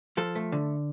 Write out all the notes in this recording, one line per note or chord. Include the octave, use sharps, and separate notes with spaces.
F3 A4
A3
D3